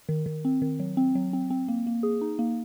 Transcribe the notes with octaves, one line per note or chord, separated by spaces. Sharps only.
D#3
D#3
C4
D#3
F#3
C4
F#3
C4
C4
A#3
A#3
G#4
D#4
A#3